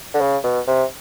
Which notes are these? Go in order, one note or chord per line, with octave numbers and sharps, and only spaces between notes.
D3
C#3
B2
C3